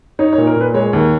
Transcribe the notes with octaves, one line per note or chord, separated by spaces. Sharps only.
D#4 C#5
C#5
A#2
A#4
A#2 B4
G#3 C#5
D#2